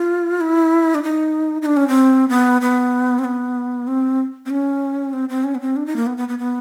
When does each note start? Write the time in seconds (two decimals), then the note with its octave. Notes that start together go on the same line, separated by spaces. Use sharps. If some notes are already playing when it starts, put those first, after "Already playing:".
Already playing: F4
0.41 E4
0.95 D4
1.03 D#4
1.62 D#4
1.66 D4
1.77 C#4
1.88 C4
2.29 B3
2.61 B3
3.19 C4
3.24 B3
3.87 C4
4.46 C4
4.50 C#4
5.13 C4
5.29 C4
5.44 C#4
5.55 B3
5.61 C4
5.76 D4
5.86 D#4
5.96 A#3
6.07 B3
6.17 B3
6.28 B3
6.39 B3